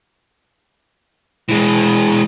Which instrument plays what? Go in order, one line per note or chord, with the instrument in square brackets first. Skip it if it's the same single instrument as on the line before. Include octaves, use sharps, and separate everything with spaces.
[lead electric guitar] E3 G#3